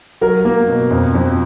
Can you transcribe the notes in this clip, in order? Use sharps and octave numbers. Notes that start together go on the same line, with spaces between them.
F#3 A#4
A#3
B2
F2
F2